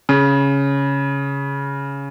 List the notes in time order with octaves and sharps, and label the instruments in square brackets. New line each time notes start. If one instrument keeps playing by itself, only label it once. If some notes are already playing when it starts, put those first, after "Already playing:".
[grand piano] C#3